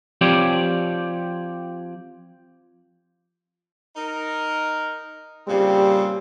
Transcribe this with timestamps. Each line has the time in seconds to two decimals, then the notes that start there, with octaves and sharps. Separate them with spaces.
0.21 F3 C4 G4 C#5 D5
3.96 D#4 A#4
5.48 A#2 C#3 G3 C4